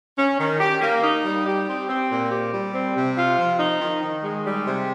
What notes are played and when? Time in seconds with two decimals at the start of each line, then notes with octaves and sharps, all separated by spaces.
0.17 C#4
0.39 D#3
0.60 G4
0.81 A#3
1.03 D#4
1.24 G3
1.45 G4
1.68 C4
1.89 C4
2.10 A#2
2.31 G4
2.53 G3
2.73 C4
2.96 C3
3.17 F4
3.38 F3
3.59 D#4
3.80 D#3
4.01 D#3
4.24 G#3
4.45 G3
4.67 C3